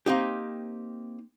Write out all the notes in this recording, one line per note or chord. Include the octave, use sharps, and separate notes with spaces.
A#3 C4 D#4 G4